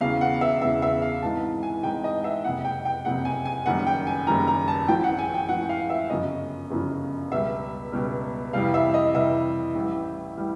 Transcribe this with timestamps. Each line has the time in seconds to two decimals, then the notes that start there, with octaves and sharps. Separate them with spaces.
0.01 E1 E2 C#3 F5
0.21 F#5
0.41 E5
0.62 E1 E2 C#3 E5
0.82 E5
1.02 F5
1.22 G#1 G#2 E3 A5
1.63 G#5
1.83 G#1 G#2 E3 G5
2.04 D#5
2.24 E5
2.44 F#1 F2 C3 F#5
2.65 G5
2.85 G5
3.05 F#1 F2 C3 F#5
3.25 G#5
3.45 G#5
3.66 F#1 F#2 D#3 G3 F#5
3.87 G5
4.07 G#5
4.27 F#1 F#2 D#3 G3 A#5
4.47 A#5
4.68 A5
4.88 A1 A2 F3 G5
5.04 F#5
5.19 G#5
5.34 G5
5.49 A1 A2 F3 F#5
5.69 F5
5.90 E5
6.10 G1 F#2 C#3 F3 D#5
6.70 G1 F#2 C#3 F3
7.32 C#2 B2 G3 E5
7.92 C#2 B2 G3
8.53 F2 C3 E3 G3 F5
8.74 E5
8.94 D#5
9.14 F2 C3 E3 G3 E5
9.75 A1 A2 E3 G3
10.37 A2 E3 G3